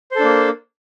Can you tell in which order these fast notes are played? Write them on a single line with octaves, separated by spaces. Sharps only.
C5 A4 D4 A#3